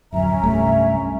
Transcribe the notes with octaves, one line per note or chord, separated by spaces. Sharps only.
D1 F#2 C#4 E5 A#5
C2 G2 A3